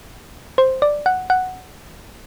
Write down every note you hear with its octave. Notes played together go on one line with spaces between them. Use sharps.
C5
D5
F#5
F#5